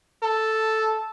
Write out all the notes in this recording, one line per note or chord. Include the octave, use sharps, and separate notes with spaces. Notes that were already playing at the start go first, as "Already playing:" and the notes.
A4